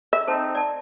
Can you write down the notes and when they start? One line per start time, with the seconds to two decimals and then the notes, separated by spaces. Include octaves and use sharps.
0.13 E5
0.27 C4 D#4 A4 C5 A5
0.55 D5 A5